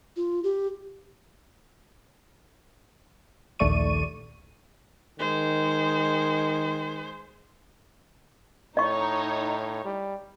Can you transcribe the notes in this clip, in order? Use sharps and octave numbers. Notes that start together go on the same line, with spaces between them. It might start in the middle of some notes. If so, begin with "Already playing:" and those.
F4
G4
A#1 D#2 A3 D5 C#6 D#7
D#3 G#3 C5
A2 D#4 C#5 D#5 C#6
G3